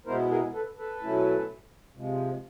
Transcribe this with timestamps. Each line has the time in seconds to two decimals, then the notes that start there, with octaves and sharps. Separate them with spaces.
0.06 B2 G#3 B3 E4 A#4 C5
0.30 G#4 A#4
0.53 A4 B4
0.77 A4 B4
1.02 B2 F#3 A3 C#4 E4
1.96 C3 F3 G#3